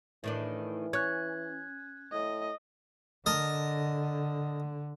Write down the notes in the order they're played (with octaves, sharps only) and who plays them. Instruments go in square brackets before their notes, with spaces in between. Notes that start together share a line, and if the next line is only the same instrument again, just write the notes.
[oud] A2 D#3 D4 [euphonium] E3
[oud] C#4 [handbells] F#6 G#6
[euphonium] A2 [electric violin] D#5
[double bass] D3 [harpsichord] A#4 D#5 A5